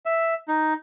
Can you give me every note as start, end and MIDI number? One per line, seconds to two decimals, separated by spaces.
0.06 0.34 76
0.48 0.73 63